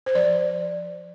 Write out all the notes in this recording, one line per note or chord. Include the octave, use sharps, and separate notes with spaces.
C5
F3 D5